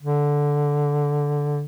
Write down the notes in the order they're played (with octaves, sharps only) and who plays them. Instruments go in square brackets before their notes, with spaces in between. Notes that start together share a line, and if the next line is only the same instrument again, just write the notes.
[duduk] D3